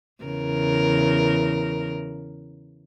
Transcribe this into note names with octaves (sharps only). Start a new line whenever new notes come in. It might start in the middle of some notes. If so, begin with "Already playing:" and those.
E2 C#3 A#4